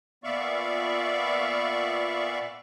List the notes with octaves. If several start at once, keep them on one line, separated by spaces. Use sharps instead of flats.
A#2 B3 D5 E5 F5 C#6